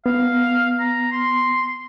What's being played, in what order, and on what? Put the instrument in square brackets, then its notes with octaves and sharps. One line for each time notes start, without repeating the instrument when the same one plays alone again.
[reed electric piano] B3 [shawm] F5
[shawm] A#5
C6